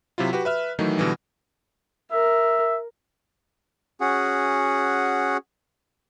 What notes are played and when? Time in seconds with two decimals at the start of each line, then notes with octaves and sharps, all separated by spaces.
0.18 C3 F#3 E4 F4
0.33 F#4 G4 B4
0.45 B4 E5 F6
0.79 D#3 E3 F#3 A3 D#4
0.98 B2 D3 E3 G3
2.12 A#4 E5
4.01 C#4 F#4 G#4 F#5